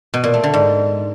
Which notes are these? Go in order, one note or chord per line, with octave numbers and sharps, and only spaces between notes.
B2
A#2
A3
D3
G#2